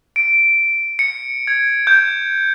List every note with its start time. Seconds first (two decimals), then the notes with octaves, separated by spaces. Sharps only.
0.16 D7
0.99 C#7
1.47 G#6
1.87 G6